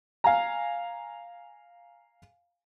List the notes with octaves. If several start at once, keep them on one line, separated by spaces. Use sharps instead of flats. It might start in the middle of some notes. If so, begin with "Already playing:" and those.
F5 G#5 A#5